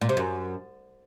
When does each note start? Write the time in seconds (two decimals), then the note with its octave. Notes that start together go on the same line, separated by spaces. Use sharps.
0.01 A#2
0.09 C3
0.17 F#2